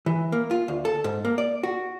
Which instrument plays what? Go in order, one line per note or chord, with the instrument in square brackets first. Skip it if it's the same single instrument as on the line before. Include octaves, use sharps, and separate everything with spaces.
[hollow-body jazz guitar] E3
A#3
F4
D2
A4
G#2
A#3
D5
F#4